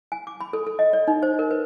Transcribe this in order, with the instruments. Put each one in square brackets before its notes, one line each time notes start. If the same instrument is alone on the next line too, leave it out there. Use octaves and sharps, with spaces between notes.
[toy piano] G#5
D6
B5
A4
A4
D#5
D5
D#4
C5
A#4
B4